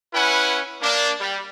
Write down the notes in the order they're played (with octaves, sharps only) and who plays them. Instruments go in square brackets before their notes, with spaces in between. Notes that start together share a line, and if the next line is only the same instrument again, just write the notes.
[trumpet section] C#4 E4 B4 F#5 G#5
A#3 D4
G3